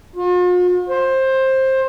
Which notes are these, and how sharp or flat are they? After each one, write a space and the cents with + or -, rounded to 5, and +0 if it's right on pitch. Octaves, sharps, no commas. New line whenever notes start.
F4 +45
C5 +15